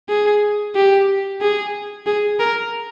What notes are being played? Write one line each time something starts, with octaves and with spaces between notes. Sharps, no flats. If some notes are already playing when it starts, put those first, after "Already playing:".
G#4
G4
G#4
G#4
A#4